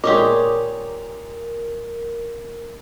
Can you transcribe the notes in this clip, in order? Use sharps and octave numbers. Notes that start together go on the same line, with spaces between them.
A#2 G#3 G4 A#4 C#5 D#5 D6